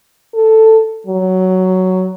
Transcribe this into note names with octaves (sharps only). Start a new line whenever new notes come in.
A4
F#3